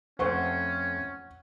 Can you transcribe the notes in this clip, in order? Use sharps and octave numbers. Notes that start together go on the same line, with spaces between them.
F2 A3 C#4 C5 F#5 C#6